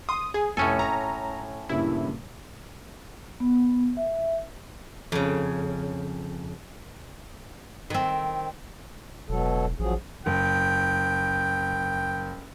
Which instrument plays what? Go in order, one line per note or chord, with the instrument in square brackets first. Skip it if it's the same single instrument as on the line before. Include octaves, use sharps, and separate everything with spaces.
[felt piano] C6 [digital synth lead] D#6
[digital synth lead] G#4 [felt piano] G#5
[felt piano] F1 [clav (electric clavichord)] A2 C#4 A4 [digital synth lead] G#5
[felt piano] G#5 [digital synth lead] A#5
[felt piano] G2 A#2 C#3 [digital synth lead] E4
[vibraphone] B3
E5
[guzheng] F2 C#3
[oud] D#3 C4
[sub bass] E1 [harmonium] B2 F#3 A4
[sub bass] A1 [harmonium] F3 F#3 G#4
[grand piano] F#1 [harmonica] G5